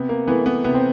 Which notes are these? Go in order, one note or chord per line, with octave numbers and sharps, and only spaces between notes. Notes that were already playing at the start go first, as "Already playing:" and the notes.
Already playing: C3 B3
A#3
E3 A3 B3
B3
C3 B3
C4